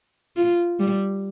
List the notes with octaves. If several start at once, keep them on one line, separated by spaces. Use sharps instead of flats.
F4
G3